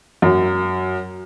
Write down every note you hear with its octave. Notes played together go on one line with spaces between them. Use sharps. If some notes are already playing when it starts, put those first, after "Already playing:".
F#2